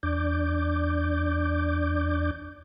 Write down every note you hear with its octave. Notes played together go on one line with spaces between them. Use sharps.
E2 D4 D5 D6 G6